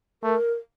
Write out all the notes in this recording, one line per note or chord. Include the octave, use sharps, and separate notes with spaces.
A3 A#4